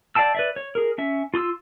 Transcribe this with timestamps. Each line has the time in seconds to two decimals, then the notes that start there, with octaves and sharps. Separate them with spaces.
0.15 D5 F5 G5 A5 E6
0.35 B4 D5 E5
0.56 C#5
0.75 G#4 A#4
0.98 C#4 E5
1.34 F4 C6 D#6 E6